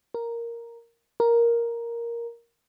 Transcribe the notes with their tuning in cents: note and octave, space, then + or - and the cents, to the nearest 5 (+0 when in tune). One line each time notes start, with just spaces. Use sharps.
A#4 +0
A#4 +5